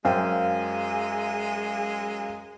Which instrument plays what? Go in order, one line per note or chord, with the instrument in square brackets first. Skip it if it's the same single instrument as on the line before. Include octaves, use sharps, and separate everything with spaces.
[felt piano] F#2 C5 G5 [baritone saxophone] G#3 [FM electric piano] F5 [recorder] G#5